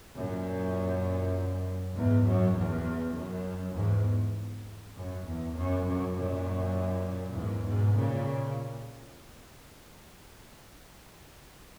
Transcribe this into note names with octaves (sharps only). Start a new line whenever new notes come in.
F#2 A#2
E2 G#2
F#2
E2
F#2
E2 G#2
F#2
E2
F#2
F#2
F#2 A#2
E2 G#2
G#2 B2
A#2 C#3